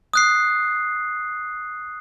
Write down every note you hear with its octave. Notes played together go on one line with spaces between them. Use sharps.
D#6 F#6 C7